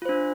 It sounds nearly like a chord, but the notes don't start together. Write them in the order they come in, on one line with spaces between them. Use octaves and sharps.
F4 C5 D4